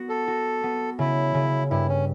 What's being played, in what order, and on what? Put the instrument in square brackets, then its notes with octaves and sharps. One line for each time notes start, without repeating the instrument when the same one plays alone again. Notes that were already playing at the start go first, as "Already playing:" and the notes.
Already playing: [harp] B3 F#4
[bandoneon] A4
[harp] F#4
B3
[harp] C#3 [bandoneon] E4
[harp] C#3
[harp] G2 [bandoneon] E4
[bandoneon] C#4